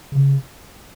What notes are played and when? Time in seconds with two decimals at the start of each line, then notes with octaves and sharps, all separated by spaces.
0.12 C#3